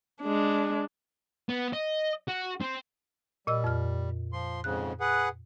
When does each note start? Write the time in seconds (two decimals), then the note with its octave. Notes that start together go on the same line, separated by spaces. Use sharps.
0.23 G#3 D4
1.49 B3
1.73 D#5
2.28 F#4
2.61 C4
3.47 A#2 G3 D#5 E6
3.64 F2 F6
4.33 F3 C6
4.64 F2 G#2 C#3 F#6
5.00 G#4 B4 F#5